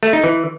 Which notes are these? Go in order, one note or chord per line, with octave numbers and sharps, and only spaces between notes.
A3
D#4
E3